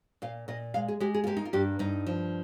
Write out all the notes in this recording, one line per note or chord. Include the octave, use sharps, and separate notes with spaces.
A#2 F5
A#2 D#5
G#3 F5
G#4
G#3 G4
G#4
F4
A#3 G4
D#4
F4
G2 G4
G2 D#4
F3